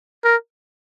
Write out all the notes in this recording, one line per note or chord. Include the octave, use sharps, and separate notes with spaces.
A#4